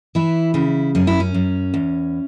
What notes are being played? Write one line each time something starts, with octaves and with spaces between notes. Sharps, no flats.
E3 E4
C#3 E4
F#2 C#4
E4
C#4
F#2
E2